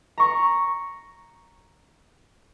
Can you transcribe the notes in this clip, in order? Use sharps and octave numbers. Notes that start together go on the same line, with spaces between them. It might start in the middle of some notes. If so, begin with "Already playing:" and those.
A#5 C#6